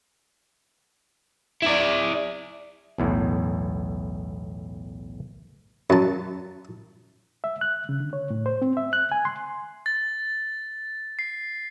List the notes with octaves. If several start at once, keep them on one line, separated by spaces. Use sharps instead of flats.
E4 D5
B1 E2 A2
F#2 A5
E5
F#6
C#3
D3
C#5
A2
C5
C4
E5
F#6
G#5
C6
A6
C7